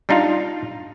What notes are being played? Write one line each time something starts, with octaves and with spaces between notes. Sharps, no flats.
G3 D4 D#4 F4 F5